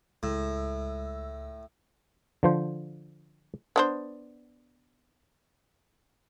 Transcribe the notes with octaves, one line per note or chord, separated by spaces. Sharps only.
C#2 A2 G#3 E6
D3 F3 C5
B3 D4 C5